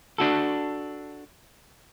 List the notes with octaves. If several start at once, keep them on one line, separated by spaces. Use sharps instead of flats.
D4 F#4 A4